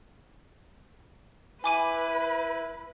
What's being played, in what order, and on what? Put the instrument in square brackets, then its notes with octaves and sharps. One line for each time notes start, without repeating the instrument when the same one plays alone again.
[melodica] E4 [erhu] B4 [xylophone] G#5 D6 D#7